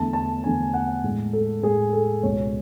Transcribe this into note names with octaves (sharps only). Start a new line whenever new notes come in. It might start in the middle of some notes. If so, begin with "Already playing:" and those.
Already playing: E2 D3 A3 A5
A5
E2 D3 A3 G#5
F#5
A2 G#3
A4
A2 G#3 G#4
A4
C#2 B2 G#3 C#5